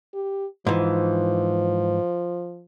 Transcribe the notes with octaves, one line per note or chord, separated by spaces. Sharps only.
G4
G#2 E3 F3